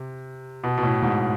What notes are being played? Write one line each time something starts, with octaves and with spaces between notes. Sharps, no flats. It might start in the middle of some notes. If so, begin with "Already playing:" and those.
Already playing: C3
B2
B2
A2
G#2